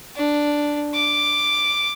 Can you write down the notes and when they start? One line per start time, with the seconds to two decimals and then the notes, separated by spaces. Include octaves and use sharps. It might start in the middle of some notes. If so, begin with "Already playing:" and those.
0.16 D4
0.94 D6